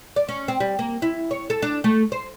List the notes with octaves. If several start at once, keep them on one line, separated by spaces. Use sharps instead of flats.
D5
C#4
C4
G3
A#3
E4
C#5
A4
D4
A3
C5